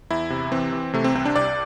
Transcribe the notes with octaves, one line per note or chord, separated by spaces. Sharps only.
E2 E4
C3
E3 C4
E3
C3 A3
C4
C2 C4
D4
C2 D5